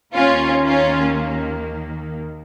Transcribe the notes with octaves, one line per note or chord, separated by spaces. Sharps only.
D#2 D#3 A#3 C#4 F4
C#4 F4